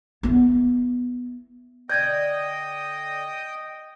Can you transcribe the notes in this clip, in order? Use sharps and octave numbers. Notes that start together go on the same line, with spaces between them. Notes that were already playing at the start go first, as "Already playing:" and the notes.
B3 E4
D3 D5 D#5 G5 D#6 G6 G#6